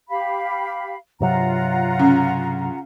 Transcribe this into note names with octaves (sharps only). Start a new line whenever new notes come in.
G4 F5 B5
G2 C3 F#3 F4 F#5 A#5
C#3